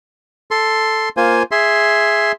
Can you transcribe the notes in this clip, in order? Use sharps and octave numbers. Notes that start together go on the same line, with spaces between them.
A4 C6
A#3 F4 C5 G#5
G#4 E5 C6